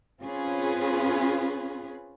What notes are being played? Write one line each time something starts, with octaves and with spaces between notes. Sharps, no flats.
C4 C#4 F4 G#4 B4